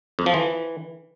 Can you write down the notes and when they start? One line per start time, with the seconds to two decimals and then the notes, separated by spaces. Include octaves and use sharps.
0.19 F2
0.26 F3
0.34 E3